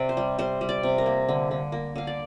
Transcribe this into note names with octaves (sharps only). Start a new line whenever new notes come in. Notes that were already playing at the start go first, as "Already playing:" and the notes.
Already playing: C3 D5
C5
G3
G3 C5
G3
D5
C3
A#4
A#3
D3
D3
A#3
D3 F5
D5